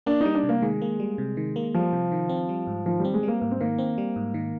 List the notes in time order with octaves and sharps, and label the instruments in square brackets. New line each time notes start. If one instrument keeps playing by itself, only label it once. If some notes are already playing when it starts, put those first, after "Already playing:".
[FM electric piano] A#3 [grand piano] D4
[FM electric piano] G3 [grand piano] D#4
[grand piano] D4
[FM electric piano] C3
[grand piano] A#3
[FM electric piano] D#3 [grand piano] G#3
[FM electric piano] A#3
G3
C3
D#3
A#3
[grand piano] F3 [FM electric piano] G3
[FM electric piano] C3
D#3
C4
G3
G#2
[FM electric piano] D#3 [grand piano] F3
[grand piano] G3 [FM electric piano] C4
[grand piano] G#3
[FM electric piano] G3 [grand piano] A#3
[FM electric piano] G#2 [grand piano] A#3
[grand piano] C4
[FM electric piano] D#3 [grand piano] A#3
[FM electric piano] C4
G3
G#2
D#3